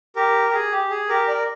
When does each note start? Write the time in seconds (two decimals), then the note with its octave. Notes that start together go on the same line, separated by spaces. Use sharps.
0.16 G4 A#4
0.49 G4
0.54 G#4
0.72 G4
0.90 G#4
1.09 G4 A#4
1.28 A#4 D5